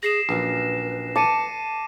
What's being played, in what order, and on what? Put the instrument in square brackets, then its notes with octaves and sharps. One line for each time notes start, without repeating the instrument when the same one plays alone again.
[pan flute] G#4 [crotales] A#6 C7 E7
[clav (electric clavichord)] A#1 F#2 [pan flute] B4
[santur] A5 [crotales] D6 C#7 D#7